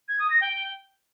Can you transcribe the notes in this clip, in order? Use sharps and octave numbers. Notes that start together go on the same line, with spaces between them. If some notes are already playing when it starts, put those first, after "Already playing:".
G#6
D#6
A#6
G5